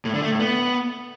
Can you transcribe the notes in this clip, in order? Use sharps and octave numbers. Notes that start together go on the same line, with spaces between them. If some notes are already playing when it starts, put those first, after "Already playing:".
A2
D3
A3
A2
B3